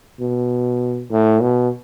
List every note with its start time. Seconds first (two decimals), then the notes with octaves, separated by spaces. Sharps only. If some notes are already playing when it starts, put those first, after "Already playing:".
0.20 B2
1.11 A2
1.42 B2